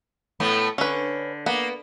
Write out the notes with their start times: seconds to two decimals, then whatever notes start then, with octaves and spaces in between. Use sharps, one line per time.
0.40 A2 A3 B3
0.78 D3 C#4 B4
1.46 A#3 B3